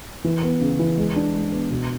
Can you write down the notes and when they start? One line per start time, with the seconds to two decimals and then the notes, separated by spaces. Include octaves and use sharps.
0.24 E3
0.43 B3
0.61 C#3
0.79 E3
0.97 G#3
1.16 D4
1.34 G#3
1.52 B3
1.70 B2